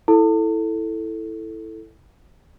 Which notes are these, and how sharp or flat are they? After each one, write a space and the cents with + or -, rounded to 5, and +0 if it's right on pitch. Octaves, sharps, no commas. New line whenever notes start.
E4 -10 A4 +0